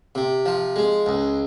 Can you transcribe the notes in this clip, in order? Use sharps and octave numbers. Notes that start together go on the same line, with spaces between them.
C3
F3
G#3
C#2